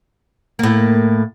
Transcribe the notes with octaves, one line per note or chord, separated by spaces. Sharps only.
A2 A#3